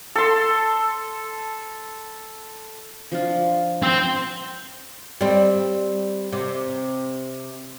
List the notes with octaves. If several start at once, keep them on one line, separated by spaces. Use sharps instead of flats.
A4 C6
F3 D4 F4
C4 C5
G3 C4
C3